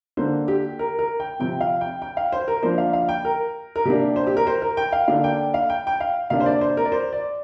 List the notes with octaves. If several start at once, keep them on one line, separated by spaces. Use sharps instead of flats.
D3 A#3 D4 C5
G4
A#4
A#4
G5
C3 F3 C4 G5
F5
G5
G5
F5
C5
A#4
F3 A#3 D4 C5
F5
F5
G5
A#4
A#4
C3 A#3 D4 G4
C5
G4
A#4
C5
A#4
G5
F5
D3 A#3 D4 F5
G5
F5
G5
G5
F5
C3 A#3 D4 F5
C5
D5
C5
A#4
D5
C5
D5